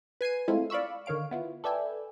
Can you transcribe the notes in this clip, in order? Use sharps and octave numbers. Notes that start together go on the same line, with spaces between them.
B4 G#5 C7 D#7
G#3 A3 C4 E4 F4
D5 F5 B5 C#6 E6
D3 D#3 C#5 F5 D7
B3 E4 F4
A4 B4 D5 E5 G5 G#5